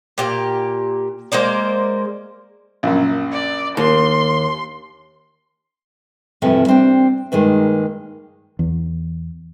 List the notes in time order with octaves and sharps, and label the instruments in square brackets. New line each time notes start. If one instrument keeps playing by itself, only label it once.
[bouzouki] A#2 G4 F5
G#3 A#3 C5 D5
[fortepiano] A#1 F#2
[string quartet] D5
[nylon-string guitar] D#2 [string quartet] C6
[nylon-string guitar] G2 C3 E3 F3 G3 A3
G3 A#3 C4 D4 G5
G2 D#3 G3 G#3 A#3
[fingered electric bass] E2